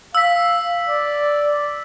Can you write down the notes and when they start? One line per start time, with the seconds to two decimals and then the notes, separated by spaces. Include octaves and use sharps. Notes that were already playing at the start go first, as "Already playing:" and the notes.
0.15 F5 E6 B6
0.89 D5